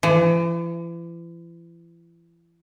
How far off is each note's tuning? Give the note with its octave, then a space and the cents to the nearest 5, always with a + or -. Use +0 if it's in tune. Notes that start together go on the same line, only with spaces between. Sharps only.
E3 +40